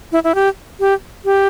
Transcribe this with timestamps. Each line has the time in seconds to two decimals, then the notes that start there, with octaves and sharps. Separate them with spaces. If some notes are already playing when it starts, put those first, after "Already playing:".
0.12 E4
0.24 E4
0.35 G4
0.80 G4
1.25 G4